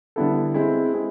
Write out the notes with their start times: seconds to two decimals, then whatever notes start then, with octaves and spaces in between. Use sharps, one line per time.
0.16 D3 G3 B3 E4 A4
0.54 G#3 C4 E4 G#4
0.93 G#3 C4 E4 G#4